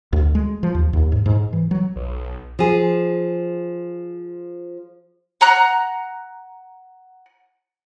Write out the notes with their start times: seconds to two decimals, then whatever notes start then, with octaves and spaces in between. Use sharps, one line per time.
0.13 D2
0.35 G#3
0.63 F3
0.75 D#2
0.93 D#2
1.12 G#2
1.26 G#2
1.53 E3
1.71 F#3
1.96 B1
2.59 F3 G#4
5.41 F#5 A#5 F#6